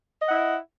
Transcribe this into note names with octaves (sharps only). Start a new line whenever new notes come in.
E4 D#5 F#5